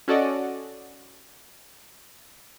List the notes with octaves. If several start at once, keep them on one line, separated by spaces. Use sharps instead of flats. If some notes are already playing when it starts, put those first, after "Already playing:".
C#4 F#4 A4 D5 D#5